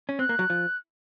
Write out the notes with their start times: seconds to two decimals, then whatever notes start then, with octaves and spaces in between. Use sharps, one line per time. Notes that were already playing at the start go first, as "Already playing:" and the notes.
0.09 C#4
0.19 C4 F#6
0.29 A#3
0.39 F#3
0.50 F3